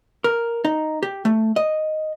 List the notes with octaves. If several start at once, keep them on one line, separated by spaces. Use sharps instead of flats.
A#4
D#4
G4
A3
D#5